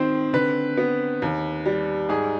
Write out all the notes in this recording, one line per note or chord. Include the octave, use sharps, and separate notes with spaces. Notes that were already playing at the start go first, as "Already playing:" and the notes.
Already playing: D#3 C4 C5
D3 B4
B3
D#2
G3
G#2 G#4